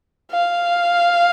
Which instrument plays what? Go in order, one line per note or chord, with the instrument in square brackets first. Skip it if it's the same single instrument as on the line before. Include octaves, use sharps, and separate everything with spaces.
[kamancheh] F5